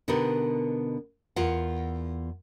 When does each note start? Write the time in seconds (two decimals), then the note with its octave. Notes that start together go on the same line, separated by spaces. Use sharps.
0.08 B2 D3 B3 D#4 G4 A#4
1.36 E2 F4 A#4 F#5